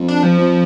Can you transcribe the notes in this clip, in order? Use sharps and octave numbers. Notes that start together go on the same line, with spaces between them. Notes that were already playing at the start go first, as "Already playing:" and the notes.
Already playing: F2
D4
F3
F2